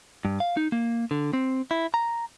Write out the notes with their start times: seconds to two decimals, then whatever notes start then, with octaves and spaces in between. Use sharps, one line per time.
0.25 G2
0.40 F5
0.57 D#4
0.72 A#3
1.11 D3
1.33 C4
1.71 E4
1.94 A#5